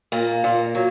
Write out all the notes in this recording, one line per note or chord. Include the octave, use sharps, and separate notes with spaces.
A#2 A#3
A#2
F#3